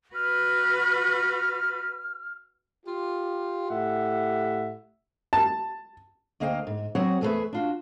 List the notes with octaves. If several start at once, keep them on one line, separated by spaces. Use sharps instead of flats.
F#4 B4 F6
F4 G4
A2 G4 E5 F#5
A5
D2 A#3 D#5 F5 G5
G#2
F#3 C4 F#4 G#4 C#5 F#5
E2 A3 G#4 A4 B4 E5
D4 F4 F#4